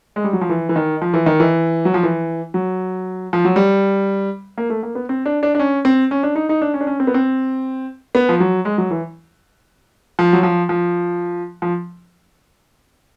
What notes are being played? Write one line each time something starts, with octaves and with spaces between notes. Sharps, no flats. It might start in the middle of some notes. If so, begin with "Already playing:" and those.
G#3
G3
F#3
F3
E3
E3
D#3
F3
E3
D#3
E3
F#3
F3
E3
F#3
F3
F#3
G3
A#3
A3
A#3
B3
C4
D4
D4
D4
C#4
C4
C#4
D4
D#4
D#4
D4
C#4
D4
C#4
C4
B3
C4
B3
F3
F#3
G#3
F#3
E3
F3
F#3
F3
F3
F3